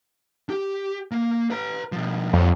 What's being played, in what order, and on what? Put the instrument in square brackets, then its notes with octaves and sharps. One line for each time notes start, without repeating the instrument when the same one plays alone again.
[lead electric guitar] G4
A#3
B4 A#5
B2 F3
[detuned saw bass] F2 [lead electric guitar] F3 C#5